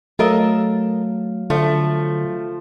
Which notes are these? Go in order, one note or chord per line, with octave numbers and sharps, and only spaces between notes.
F#3 A3 A4 A#4 D#5 F5
D3 F3 A3